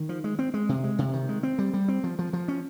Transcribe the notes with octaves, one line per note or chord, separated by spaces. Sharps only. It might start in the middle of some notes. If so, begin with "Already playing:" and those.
Already playing: D#3
F3
G#3
C4
G#3
C3
G#3
C3
D#3
G#3
C4
G3
G3
C4
F3
F3
F3
C#4